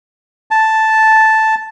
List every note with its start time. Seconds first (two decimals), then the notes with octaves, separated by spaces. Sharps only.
0.51 A5